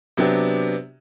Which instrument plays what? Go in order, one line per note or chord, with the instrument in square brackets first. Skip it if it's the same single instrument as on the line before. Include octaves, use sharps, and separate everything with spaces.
[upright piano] C3 F#3 B3 D4 G4